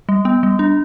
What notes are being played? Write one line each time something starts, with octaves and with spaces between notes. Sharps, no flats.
G3
B3
G3
D4